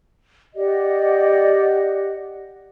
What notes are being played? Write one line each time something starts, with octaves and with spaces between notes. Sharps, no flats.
G4 D5 D#5 F#5